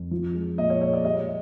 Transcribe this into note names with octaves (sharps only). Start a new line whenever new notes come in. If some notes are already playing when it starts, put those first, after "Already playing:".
Already playing: F2
F3
G#3
A#2 D#5
C#5
G#3 C#5
D5
G3 D#5